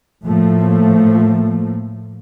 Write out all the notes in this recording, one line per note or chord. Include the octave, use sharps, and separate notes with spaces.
A2 F3 A3 A#3